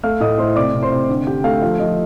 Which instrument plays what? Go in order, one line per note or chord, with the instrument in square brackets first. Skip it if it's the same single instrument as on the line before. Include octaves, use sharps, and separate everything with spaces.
[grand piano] A3 F5 F6
A2 D#5 D#6
A3 C5 C6
C3 D5 D6
C3
C5 C6
C3
D3
D3 G4 G5
A3 F5
F3 F5
F3 D#5